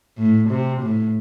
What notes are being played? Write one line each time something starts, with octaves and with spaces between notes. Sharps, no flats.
A2
C3
A2